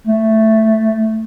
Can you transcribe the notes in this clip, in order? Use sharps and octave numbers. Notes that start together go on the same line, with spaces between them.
A3